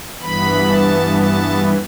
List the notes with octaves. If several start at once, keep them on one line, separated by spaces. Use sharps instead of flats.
G2 E3 B3 B5
A5
A5